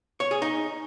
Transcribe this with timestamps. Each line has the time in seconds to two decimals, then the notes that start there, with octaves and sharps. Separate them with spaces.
0.20 C#5
0.31 G#4
0.42 D#4